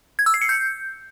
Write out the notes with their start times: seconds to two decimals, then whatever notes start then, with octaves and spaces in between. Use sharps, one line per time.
0.19 G#6
0.26 E6
0.34 C7
0.41 C#7
0.49 G6